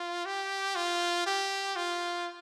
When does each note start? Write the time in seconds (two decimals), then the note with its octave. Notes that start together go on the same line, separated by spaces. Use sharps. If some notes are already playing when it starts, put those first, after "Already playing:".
Already playing: F4
0.25 G4
0.75 F4
1.26 G4
1.76 F4